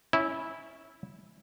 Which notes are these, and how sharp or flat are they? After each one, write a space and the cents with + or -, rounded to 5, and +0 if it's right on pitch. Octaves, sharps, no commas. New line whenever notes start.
C#4 +0 E4 -10